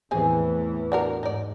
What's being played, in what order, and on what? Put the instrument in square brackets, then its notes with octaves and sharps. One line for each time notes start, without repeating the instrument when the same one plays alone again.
[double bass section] E2 A2 E3 [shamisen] C4 G#4 G#5
[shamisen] D4 F#4 A#4
[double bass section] G#2 [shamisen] D#4 D5